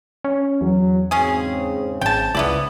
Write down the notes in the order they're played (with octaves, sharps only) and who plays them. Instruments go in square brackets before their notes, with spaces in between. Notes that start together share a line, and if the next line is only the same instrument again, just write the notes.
[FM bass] C#4
[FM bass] E2 [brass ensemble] F#3
[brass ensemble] G#2 C#3 C4 [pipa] C#4 G#4
[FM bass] G#1 [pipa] G5 A5
[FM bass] C#2 [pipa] B3 E4 D5